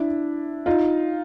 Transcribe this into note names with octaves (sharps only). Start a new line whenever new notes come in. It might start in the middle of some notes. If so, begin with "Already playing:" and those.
Already playing: D4 E4
D#4 F4